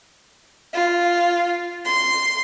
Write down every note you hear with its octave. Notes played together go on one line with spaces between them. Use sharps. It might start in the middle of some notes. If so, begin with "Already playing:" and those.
F4
C6